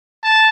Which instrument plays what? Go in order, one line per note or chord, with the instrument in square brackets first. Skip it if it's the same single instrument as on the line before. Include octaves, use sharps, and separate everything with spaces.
[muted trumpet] A5